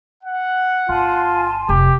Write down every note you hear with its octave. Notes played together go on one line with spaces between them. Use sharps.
F#5
G1 F4 G#5 A5 C6
F1 G4